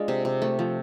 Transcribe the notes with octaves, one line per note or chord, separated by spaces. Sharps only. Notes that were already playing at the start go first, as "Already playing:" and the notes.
Already playing: G#3 D4 F4
C3
C3
A3
F3